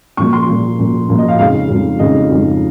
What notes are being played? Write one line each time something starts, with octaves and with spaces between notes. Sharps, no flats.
A#2 F3 A#3 C#6
C6
A#2 F3 A#3
A#2 F3 A#3
A#2 F3 A#3
D#5
F5
F2 C#3 G#3 D#4 F5
F2 C#3 G#3 D#4
F2 C#3 G#3 D#4 D#5
F2 C#3 G#3 D#4